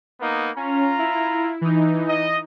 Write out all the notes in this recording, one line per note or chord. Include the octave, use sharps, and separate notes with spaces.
A#3 B3 D#4
C#4 F4 A#5
E4
E3 D#4
D#5